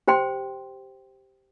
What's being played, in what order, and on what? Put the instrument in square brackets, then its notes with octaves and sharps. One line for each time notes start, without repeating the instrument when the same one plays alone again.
[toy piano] G4 C5 G5 C6